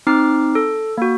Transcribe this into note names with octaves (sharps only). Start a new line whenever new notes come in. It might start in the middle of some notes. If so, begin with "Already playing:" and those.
C4 D#4 D6 F6 C7
A4
A#3 F#4